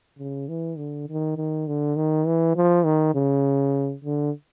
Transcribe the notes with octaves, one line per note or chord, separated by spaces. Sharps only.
C#3
E3
D3
D#3
D#3
D3
D#3
E3
F3
D#3
C#3
D3